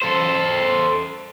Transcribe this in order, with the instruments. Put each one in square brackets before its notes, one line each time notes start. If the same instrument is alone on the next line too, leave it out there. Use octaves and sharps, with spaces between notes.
[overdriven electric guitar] A4 C5